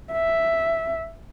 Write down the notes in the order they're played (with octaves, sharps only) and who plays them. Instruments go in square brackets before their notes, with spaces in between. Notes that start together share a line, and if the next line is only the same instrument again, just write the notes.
[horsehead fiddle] E5